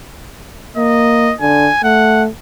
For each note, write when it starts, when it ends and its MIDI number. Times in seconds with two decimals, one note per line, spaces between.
0.77 1.32 58
0.77 1.35 75
1.41 1.69 50
1.41 1.80 80
1.84 2.28 57
1.84 2.23 78